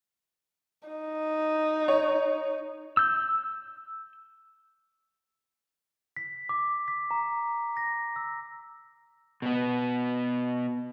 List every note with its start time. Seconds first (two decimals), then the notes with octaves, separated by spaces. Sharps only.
0.88 D#4
1.88 C#5
2.97 E6 G6
6.17 B6
6.49 D6
6.88 B6
7.11 A#5
7.77 A#6
8.16 E6
9.42 B2 B3